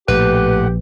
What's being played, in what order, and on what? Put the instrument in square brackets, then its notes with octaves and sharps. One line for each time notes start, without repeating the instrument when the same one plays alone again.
[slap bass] A#1 [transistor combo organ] A2 F#5 [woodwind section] G4 [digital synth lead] B4